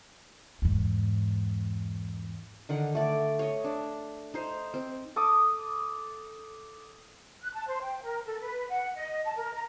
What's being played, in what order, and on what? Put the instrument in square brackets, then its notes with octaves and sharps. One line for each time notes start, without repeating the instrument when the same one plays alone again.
[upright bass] E2 G#2
[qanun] D3 D#3 F#5
A3 D5
C#5 D#5
D4
D#4 C5
C4
[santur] A4 D6 D#6
[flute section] F#6
A5
C5
G5
A#4
A4
B4
F#5
D#5
A5
A#4
A#5